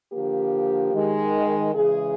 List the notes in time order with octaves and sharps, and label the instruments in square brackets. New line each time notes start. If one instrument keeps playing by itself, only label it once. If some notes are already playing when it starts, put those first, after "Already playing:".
[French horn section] D3 F3 A#3 G4
D#3 G#3
C#3 E3 G#3 G#4